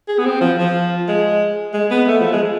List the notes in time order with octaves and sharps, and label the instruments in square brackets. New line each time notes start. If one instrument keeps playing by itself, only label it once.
[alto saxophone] G#4
B3
C4
F3
F3
G#3
G#3
B3
A3
F3
G#3